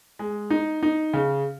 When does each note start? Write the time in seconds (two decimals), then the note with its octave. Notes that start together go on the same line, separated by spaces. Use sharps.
0.19 G#3
0.50 D#4
0.83 D#4
1.13 C#3